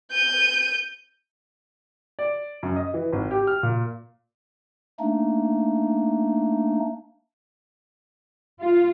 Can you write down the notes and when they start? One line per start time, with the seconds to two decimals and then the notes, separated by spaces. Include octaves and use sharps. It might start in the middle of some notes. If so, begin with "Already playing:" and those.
0.12 G6 D#7
2.19 D5
2.63 F#2
2.76 D#5
2.94 E3
3.13 G#1
3.31 G4
3.47 F6
3.63 A#2
5.00 A3 A#3 D4 D#4
8.62 F4